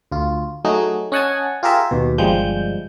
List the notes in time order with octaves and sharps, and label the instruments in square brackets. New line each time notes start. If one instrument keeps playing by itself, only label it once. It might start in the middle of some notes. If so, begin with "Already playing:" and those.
[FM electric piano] D2 F4
F#3 A3 D#4 F#4 G#4
C#4 D#5 F#5 G#5 A5 G#6
F4 G4 G#4 A#4 E5
D#2 B2
G1 F3 G3 G#3 G6